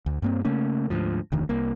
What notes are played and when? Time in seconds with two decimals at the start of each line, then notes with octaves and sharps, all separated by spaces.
0.06 D2
0.22 G2 A#3 C4
0.45 C#3 A3 A#3 C#4
0.90 D2 G#2 F3
1.32 F1 D2 D#3
1.49 C2 A#3